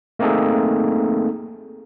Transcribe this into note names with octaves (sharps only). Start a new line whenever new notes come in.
A3 A#3 C4 D#4 G#4 A4